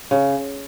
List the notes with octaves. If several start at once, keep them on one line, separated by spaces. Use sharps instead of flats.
C#3